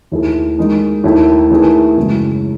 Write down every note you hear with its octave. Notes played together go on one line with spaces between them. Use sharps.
D#2 D#3 A3 E4 G#4
D#3 G#3 D#4
D#2 D#3 A3 E4
D#3 A3 E4 G#4 B4
F#2 C#3 E3 G#3